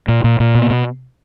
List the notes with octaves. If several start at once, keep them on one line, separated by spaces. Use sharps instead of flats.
A#2
A#2
A#2
B2
B2